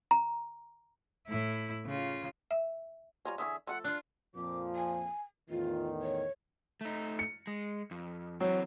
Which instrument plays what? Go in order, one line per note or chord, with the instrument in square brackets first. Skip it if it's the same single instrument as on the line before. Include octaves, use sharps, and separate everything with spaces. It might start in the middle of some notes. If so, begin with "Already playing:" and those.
[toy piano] A#5
[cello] A2 E4
C#3 F4
[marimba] E5
[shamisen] G3 F4 C5 [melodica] C#5 G#5 A#5
[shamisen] D3 E3 C#4 [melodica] G#4 E5
[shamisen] F3 G#3 A3 [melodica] A4 [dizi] F#5
[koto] D4 F4 [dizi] F#6
[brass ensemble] F2 A#2 F3 [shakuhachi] D6
[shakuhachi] G#5
[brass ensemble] E2 A2 D#3 [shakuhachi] F4
[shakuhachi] C#5
[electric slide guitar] A3 D#4
[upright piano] C#7
[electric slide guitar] G#3
F2
[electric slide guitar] E3 C4 [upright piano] F#3